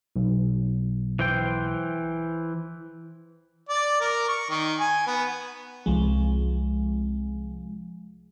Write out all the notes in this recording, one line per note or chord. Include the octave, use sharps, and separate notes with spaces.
B1
E3 C5 G5
D5
A#4
C#6
D#3
G#5
B3
C2 F3 G#3